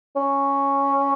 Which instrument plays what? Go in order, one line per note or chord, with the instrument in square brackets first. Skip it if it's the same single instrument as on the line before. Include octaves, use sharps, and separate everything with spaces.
[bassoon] C#4